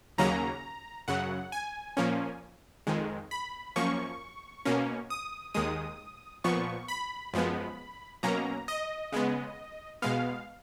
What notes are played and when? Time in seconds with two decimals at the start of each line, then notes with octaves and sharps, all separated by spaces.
0.18 D#2 C#3 F#3 A#3 C#4 A#5
1.08 F#2 C#3 F#3 F#5
1.52 G#5
1.97 A#2 F3 A#3 C#4
2.87 F2 D#3 G#3
3.31 B5
3.76 F#2 F3 A#3 C#4 C#6
4.65 B2 A#3 C#4
5.10 D#6
5.54 D#2 D#3 G#3 D#6
6.44 A#2 F3 B3 C#6
6.88 B5
7.34 F#2 F3 G#3 B3
8.23 B2 F#3 A#3 C#4 A#5
8.68 D#5
9.12 C#3 G#3 B3
10.02 B2 G#3 B3 F5